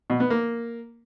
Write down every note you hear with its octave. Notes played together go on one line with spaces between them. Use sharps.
B2
B3
A#3